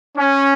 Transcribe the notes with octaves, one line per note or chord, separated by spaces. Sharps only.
C#4